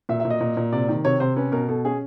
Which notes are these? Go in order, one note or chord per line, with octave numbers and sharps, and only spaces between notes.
A#2 E5
E5
A#2
D#5
A#2
A#2
C3 D5
D#3
C3 C#5
C3 C5
C#4 B4
B2 A#4
B2 A4
C#4 G#4